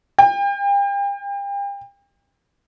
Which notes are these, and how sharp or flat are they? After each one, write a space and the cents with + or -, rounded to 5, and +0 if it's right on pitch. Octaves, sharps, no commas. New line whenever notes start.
G5 +40